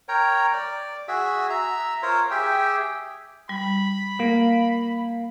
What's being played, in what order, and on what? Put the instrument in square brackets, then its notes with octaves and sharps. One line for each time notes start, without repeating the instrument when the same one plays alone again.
[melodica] A#4 C#5 G5 A#5
D5
F#4 G#4 E5
E5 A#5
F4 A#4 C5 C#5
G4 G#4 E5 G5
[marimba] G3 [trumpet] B5
[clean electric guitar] A#3